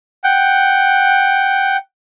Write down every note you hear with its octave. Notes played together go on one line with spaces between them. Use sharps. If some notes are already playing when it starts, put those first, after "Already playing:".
F#5 G5